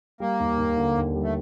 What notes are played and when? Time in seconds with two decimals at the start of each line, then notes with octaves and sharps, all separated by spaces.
0.20 G3 A#3
0.40 D#2
0.58 D#2
0.77 D3
0.97 D#2
1.15 G3
1.23 A3